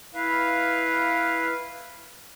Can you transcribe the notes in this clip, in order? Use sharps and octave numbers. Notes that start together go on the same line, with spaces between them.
E4 B4 F5